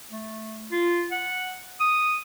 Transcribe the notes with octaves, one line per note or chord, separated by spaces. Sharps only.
A3
F4
F#5
D#6